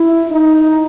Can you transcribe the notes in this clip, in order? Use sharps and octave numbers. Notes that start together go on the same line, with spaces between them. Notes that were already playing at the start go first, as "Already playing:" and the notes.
Already playing: E4
D#4